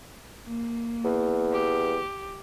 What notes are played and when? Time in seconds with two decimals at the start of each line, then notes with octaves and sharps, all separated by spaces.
0.46 A#3
1.05 E2
1.52 G4